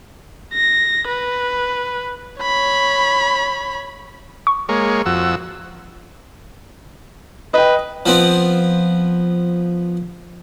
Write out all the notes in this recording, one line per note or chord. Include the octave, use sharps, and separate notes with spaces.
A#6
B4
C#5 B5
C#6
G#3 A#3 C#5
F2 F#4 E6
B4 D#5 G5
F3 B3 C4